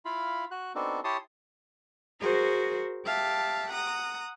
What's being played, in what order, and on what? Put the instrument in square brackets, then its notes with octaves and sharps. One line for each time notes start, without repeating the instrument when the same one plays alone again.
[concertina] E4 F4 F5 B5
F#4 F#6
B3 C4 D4 D#4 F#4 A4
E4 G4 C#5 A5 C6 D#6
[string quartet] F#4 G#4 A#4 C5
G4 E5 F5 A5
F#5 A#5 D#6